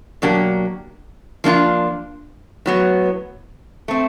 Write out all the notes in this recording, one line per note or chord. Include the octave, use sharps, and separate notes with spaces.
B2 F#3 A#3 D4 G4
F3 A#3 D4 F4
A2 F#3 B3
A3 C4